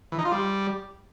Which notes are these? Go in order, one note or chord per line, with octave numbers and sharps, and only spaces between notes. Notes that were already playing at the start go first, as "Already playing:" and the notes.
E3
D#4
F4
G3